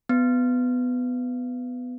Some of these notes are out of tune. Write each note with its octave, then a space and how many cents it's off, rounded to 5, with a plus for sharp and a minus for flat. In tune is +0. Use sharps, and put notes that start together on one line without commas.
B3 +15